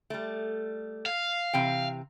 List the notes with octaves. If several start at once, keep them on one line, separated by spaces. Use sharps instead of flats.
G3 A3
F5
C3 E3 G5